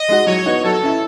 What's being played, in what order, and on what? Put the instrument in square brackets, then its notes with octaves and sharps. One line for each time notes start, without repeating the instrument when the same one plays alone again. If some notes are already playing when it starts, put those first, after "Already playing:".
Already playing: [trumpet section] D#5
[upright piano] G#3 D#4 F#4
[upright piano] F#3 [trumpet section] C#5
[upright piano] B3 D#4 F#4
[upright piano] F#3 [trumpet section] A4
[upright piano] C#4 E4